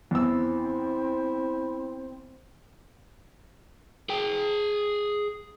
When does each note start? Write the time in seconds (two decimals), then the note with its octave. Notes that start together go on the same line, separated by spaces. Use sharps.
0.11 E2 C4 E4 E6
4.09 G#4 G5